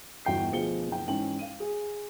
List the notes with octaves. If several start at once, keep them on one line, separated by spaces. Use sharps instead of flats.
G1 E2 F#4 G5 G6 C7
D2 B2 F3 G#4 C#7 G7
F#1 G5
G#2 E3 C#4 G5 F#7
F5 D#7
G#4